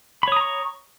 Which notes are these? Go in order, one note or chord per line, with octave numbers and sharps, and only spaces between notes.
C#5 A#5 B5 C#6 D#6